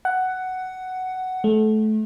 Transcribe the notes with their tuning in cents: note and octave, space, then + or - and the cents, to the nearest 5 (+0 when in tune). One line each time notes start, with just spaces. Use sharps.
F#5 +10
A3 -25